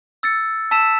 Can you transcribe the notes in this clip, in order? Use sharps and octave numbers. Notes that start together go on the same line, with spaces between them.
E6 A6 C#7
A5 E6 B6 E7